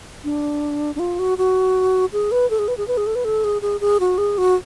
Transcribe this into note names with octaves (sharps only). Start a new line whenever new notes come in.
D4
D4
F4
F#4
F#4
G#4
B4
A4
G#4
B4
G#4
B4
G#4
A4
B4
A4
G#4
G#4
G#4
F#4
G#4
F#4